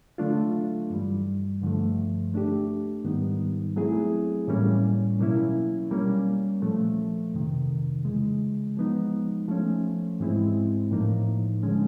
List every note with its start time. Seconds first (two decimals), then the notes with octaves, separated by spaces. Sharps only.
0.18 D3 F#3 A3 D4 F4
0.90 G2 E3 G3
1.62 G2 D3 F3 A3
2.34 A3 D4 G4
3.04 G#2 D#3 G3 B3 D#4
3.76 F#3 A3 C4 E4 G#4
4.48 A2 E3 G3 A#3 C#4
5.20 B2 F#3 A#3 C#4 E4
5.91 G3 A#3 C#4
6.62 A#2 F3 A3
7.34 F2 C3 D#3
8.05 C#3 E3 G#3
8.77 F3 G#3 B3 D#4
9.48 F3 A3 C#4
10.20 G#2 E3 G#3 C4 E4
10.91 A2 F3 A#3 D#4
11.63 D3 F3 G#3 C#4